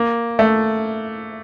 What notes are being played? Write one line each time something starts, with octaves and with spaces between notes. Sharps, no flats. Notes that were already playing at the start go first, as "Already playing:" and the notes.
Already playing: A#3
A3